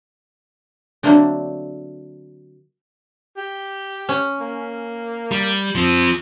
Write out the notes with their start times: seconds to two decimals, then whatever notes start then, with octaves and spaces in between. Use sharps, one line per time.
1.03 D3 F#3 A3 A#3 C4 D4
3.37 G4
4.09 C#4
4.41 A#3
5.32 G3
5.75 F3 C4